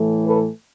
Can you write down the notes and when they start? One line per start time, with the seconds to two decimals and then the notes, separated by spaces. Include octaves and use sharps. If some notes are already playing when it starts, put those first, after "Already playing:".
Already playing: A2 E3 A3
0.26 A4 B4